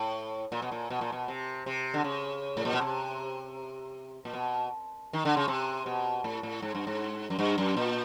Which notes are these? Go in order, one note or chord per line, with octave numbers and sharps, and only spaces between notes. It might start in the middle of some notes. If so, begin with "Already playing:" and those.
Already playing: A2
A#2
B2
A#2
B2
A#2
B2
C3
C3
D3
C#3
A2
A#2
B2
C3
A#2
B2
D#3
D3
C#3
C3
B2
A2
A2
G#2
G2
G#2
F#2
G2
F#2
A#2